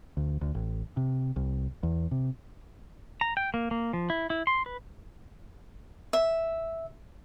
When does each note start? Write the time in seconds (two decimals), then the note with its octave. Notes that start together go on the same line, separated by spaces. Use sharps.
0.17 D2
0.41 D2
0.55 A1
0.97 C3
1.36 C2
1.83 E2
2.11 C3
3.21 A#5
3.37 G5
3.54 A#3
3.71 A#3
3.93 F3
4.10 E4
4.30 E4
4.47 C6
4.66 B4
6.13 E5